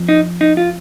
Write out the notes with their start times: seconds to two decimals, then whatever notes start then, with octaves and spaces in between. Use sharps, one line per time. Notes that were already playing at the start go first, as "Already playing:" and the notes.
Already playing: F2 F3
0.09 D#4
0.41 D#4
0.57 F4